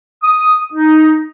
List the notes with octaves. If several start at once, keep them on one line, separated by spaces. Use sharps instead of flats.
D#6
D#4